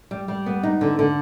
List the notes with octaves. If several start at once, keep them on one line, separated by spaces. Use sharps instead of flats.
G3
G3
B3
D#4
D3
D3